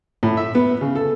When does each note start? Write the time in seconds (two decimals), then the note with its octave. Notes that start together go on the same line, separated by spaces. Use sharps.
0.23 A2
0.37 E5
0.55 B3
0.81 C#3
0.95 A4